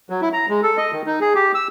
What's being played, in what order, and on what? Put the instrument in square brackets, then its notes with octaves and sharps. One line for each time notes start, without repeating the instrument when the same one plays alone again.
[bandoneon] F#3
E4
A#5
G#3
A4
D#5
D#3
D#4
G#4
G4
E6